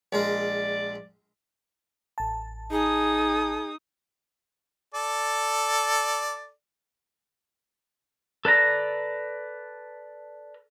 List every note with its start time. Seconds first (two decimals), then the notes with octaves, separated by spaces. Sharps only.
0.13 A#1 G#3 A#4 D5
2.18 A1 A5
2.71 D#4 G#4 D#6
4.94 A4 D5
8.45 A4 B4 D5 A#5